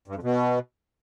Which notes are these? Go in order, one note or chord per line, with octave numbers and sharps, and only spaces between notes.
G2
F2
B2